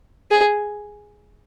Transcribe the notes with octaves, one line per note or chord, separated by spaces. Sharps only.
G#4